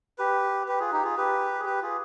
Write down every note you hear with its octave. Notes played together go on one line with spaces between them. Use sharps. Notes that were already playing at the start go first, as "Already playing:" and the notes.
G4 B4
G4 B4
F4 G#4
D#4 G4
F4 G#4
G4 B4
G#4
G4 B4
F4 G#4